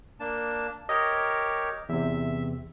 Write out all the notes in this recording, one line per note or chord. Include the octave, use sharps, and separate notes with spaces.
A#3 D4 A5
G4 A#4 C#5 D#5
E2 C3 E5